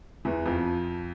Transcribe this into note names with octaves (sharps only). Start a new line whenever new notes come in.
E2 E3
F2 F3